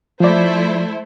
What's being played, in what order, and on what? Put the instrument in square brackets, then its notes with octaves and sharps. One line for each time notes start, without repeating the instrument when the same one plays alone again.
[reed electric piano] F3 D5 [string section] A3 E4 C5